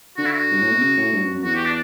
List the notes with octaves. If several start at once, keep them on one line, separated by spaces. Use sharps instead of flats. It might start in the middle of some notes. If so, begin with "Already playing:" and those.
D3 F#4
E4
F#4
G2
A2
B2
C#3
A2
G2
F#2
F#2
E2 F#4
G4
D4